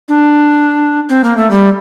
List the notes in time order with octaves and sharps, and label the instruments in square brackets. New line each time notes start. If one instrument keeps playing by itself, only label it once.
[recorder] D4
C4
A#3
A3
G3